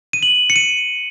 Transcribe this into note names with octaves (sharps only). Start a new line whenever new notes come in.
D#7
F#7
C#7
D#7